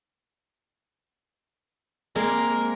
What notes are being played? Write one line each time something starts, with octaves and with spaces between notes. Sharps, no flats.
G#3 A#3 C4 A#4